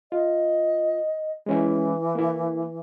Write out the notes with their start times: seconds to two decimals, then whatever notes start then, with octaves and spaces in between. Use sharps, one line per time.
0.12 F4 D#5
1.46 E3 G#3 C#4 E4
2.15 A#3 E4